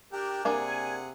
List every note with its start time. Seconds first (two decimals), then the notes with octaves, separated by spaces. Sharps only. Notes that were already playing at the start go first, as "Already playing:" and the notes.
0.12 D4 G4 A#4 G5
0.45 C3 A#3 D4 G#4 D5 F#5 G#5